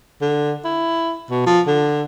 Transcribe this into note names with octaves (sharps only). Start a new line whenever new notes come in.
D3
E4
B2
F3
D3